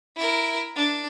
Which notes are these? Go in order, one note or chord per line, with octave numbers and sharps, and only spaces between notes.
E4 A#4
D4